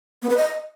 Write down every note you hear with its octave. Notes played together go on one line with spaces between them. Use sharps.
B3
B4
D#5